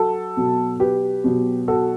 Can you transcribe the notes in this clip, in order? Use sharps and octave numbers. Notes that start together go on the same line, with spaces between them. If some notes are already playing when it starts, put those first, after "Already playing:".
Already playing: F#3 F#4 A4
B2 F#3
G4 B4
B2 F#3
F#4 A4